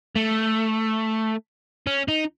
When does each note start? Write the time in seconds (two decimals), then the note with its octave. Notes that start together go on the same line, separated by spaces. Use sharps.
0.16 A3
1.87 C#4
2.08 D#4